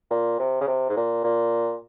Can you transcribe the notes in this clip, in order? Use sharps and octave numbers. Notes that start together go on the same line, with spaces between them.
A#2
C3
C#3
C3
G#2
A#2
A#2